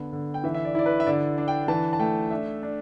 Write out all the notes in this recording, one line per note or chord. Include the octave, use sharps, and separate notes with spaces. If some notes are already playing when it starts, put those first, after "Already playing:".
Already playing: D3 B3
D3
G5
E3 E5
E5
D5
E4 D5
B4
E5
D3 D5
D4
G5
E3 A5
A5
A3 G5
D4 E5
D4